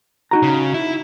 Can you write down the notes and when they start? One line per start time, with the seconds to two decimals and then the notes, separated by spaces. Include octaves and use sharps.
0.31 D#4 F#4 A#5
0.43 C#3
0.74 E4